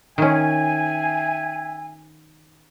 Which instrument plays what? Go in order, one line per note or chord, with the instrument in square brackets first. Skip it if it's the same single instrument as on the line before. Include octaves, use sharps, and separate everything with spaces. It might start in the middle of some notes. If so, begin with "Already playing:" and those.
[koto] D#3 C#4 [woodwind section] E5 G5 G#5